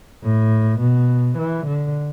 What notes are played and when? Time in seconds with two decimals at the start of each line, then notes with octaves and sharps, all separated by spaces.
0.23 A2
0.80 B2
1.38 E3
1.67 D3